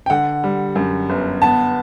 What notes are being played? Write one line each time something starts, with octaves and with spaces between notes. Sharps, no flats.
G5
D3 F#5
G3
F#2
G1
B3 A5